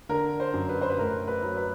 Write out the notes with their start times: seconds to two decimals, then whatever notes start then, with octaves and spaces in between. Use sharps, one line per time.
0.09 D3 A#4
0.40 C5
0.53 F#2
0.69 B4
0.82 C5
0.89 B4
0.98 A2 A#4
1.28 B4
1.43 F#3
1.57 B4